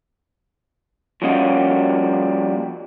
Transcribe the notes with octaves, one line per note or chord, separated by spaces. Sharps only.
F3 G3 A#3 C#4 F#4 D#5